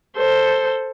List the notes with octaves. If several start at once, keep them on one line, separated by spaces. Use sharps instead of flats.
A4 C5